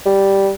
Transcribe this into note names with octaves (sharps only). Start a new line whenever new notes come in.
G3